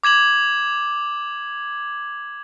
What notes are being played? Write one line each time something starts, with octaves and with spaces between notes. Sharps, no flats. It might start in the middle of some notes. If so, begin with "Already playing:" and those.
D6 G#6 E7 F#7